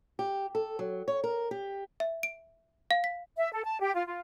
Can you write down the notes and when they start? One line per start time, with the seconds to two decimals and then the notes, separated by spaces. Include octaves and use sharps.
0.19 G4
0.55 A4
0.79 F#3
1.08 C#5
1.24 A#4
1.51 G4
2.00 E5
2.23 D7
2.91 F5
3.04 B6
3.37 E5
3.52 A4
3.65 A5
3.81 G4
3.93 F4
4.07 F4